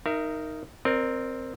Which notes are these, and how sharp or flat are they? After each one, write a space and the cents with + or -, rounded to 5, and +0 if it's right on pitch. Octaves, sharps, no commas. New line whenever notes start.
D#4 +0 A#4 -5 E5 +35
C4 +0 A#4 +0 D5 +40